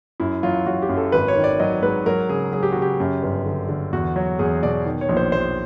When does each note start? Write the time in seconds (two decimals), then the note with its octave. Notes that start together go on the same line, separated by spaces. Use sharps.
0.20 F#2 E4
0.43 F#3 F4
0.66 F#3 F#4
0.82 G4
0.89 F#2
0.97 A4
1.12 G#1 B4
1.28 C#5
1.36 D#3
1.44 D5
1.59 F#3 D#5
1.82 G#2 B4
2.06 F#3 A#4
2.29 C#3 G#4
2.53 F#3 G#4
2.63 G4
2.72 C#3 F#4
2.82 G4
3.00 F#2
3.22 G1
3.46 D3
3.69 D3
3.92 E2 F#4
4.16 F#3
4.39 E2 G#4
4.63 B2 D5
4.86 D#3
5.01 C#5
5.09 A#1
5.17 C5
5.32 A#1 C5